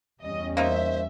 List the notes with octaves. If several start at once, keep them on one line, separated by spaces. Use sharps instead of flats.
E2 G3 C#4 D#5
A#3 D#4 F4 C5 E5